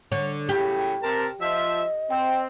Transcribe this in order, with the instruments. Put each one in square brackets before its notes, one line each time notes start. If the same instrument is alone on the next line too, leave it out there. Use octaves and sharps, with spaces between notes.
[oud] D3 C#5
[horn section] A2 C#3 F#3 [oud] G4
[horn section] C3 A#4 A5
[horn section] F3 E5 [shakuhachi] D#5
[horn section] C4 [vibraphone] G5